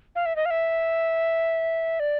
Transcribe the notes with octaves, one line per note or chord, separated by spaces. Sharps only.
F5
E5
D#5
F5
E5
D5